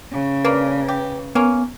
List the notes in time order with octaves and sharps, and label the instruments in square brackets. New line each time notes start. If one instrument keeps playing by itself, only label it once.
[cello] C#3
[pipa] A#3 D4 [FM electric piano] B4
[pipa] G4
[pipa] A#3 C#4 [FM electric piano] B3